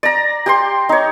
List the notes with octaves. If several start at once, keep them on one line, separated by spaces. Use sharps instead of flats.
D5 A#5
G4 G5 C6
D#4 C#5